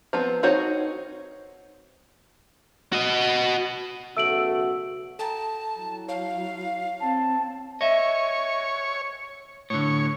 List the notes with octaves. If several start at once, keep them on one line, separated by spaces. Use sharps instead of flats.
F3 B3 C4
C4 D#4 F#4 C5 C#5
F#4 D#5
B1 C#3 A3 F#4 E6 D7 F#7
A4 G5 A5 A#5
F#3 E4
C#5 F5
C4 A5
C#5 D#5 E5
A2 D3 C#5